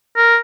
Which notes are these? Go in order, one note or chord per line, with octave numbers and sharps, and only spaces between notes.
A#4